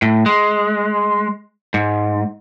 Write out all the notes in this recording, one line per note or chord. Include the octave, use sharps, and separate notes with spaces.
A2
G#3
G#2